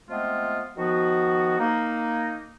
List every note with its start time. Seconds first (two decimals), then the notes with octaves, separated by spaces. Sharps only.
0.09 F3 G#3 A3 B3 C4 F4
0.78 D#3 F3 B3 F#4
1.59 A#3 D#4